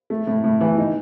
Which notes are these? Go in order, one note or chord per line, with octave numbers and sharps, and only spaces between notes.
A3
A2
A2
E3
D#4